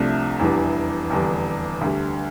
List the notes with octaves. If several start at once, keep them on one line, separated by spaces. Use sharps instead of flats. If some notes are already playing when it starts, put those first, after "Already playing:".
Already playing: C2 C3 F3 A3 D4
F1 E2 E3 G3 D4
F1 E2 D3 G3 D4
D2 D3 G3